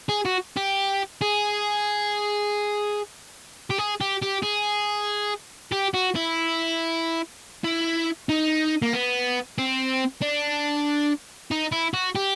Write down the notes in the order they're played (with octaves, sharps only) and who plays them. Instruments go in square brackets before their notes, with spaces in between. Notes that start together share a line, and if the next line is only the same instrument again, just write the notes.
[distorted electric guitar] G#4
F#4
G4
G#4
G4
G#4
G4
G4
G#4
G4
F#4
E4
E4
D#4
A#3
B3
C4
D4
D#4
E4
F#4
G4